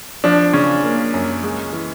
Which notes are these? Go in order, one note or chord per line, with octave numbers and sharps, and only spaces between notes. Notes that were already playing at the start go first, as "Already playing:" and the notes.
F3 D4
C#3 C#4
A#3
F#2
G#3
E3